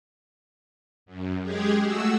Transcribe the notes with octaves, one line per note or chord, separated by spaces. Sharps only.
F#2
G#3 G4 G#4
A3 F#4 E6